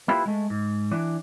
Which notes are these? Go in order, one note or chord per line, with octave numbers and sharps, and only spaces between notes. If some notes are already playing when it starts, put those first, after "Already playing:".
A#3 E4 F4 G4 B4
G#3 A3
G#2
E3 D4